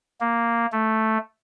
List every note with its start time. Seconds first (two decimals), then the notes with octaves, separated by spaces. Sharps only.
0.20 A#3
0.72 A3